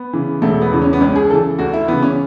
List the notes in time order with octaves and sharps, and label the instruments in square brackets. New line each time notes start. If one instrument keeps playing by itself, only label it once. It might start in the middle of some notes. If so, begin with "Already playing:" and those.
Already playing: [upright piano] B3
C#3 E3
E1 A3
B3
E2 C#3 E3
C#4
B3
C#2 C#4
G#4
C#3 E3 A4
D2 F#4
E4
C#3 E3 B3
C#4